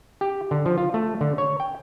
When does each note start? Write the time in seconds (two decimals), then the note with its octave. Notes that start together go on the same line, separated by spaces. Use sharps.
0.21 G4
0.51 D3
0.66 F3
0.78 F4
0.94 A3
1.21 D3
1.38 C#5
1.60 G5